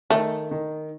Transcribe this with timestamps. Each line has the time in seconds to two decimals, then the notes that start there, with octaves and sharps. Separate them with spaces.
0.10 D#3 A3
0.51 D#3